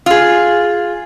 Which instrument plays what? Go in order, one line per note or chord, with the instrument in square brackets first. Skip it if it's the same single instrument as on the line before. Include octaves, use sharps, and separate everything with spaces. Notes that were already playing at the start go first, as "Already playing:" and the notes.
[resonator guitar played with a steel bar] F4 G#4